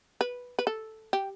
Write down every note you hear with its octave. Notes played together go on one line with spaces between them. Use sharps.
B4
B4
A4
G4